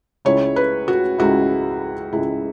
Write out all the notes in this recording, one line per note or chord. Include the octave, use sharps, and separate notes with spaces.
C#2 C#3 G#3 E4 C#5
B4
F#4
C#2 C#3 G#3 E4 F#4
C#2 C#3 G#3 E4